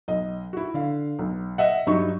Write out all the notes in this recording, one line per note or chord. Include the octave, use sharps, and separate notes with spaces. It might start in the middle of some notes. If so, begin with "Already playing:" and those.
B1 D#5
E4 F#4
D3 F5
B1
D#5 E5 F#5
G2 F#3 D#4 C#6